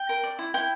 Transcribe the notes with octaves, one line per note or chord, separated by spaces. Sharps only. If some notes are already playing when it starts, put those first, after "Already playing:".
Already playing: G5
A#4
D5
E4
E4 G5